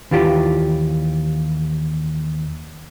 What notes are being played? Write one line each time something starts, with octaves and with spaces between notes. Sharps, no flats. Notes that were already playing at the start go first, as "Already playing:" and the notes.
D#2 E3 F4 G4